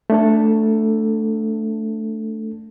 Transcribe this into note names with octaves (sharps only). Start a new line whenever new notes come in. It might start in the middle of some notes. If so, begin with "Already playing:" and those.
A3 D4 A4